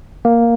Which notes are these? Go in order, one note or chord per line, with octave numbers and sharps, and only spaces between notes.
A#3